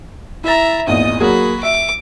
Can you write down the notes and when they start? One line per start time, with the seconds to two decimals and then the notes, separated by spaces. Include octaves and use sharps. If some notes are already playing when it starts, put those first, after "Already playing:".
0.44 E4 E5 A#5 A6
0.87 G#1 E2 A#2 D#5 D#6
1.20 F#3 A#3 F#4 G#4 B5
1.63 E5 D6